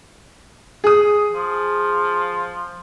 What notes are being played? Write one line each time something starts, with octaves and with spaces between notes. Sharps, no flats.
G#4 D#6
F3